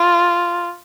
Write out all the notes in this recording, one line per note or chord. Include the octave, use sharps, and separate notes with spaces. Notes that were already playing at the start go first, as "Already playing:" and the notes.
Already playing: F4